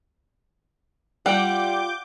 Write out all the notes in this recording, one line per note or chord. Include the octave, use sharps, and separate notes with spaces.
G3 F4 F#5 D6 G6